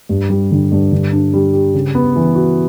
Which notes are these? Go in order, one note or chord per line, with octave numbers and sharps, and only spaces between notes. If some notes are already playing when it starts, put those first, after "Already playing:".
G2
G3
D3
G2
D3
D4
G3
G4
C#3
B3
E3
F#4